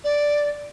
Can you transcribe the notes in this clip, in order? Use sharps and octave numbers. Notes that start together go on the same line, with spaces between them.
D5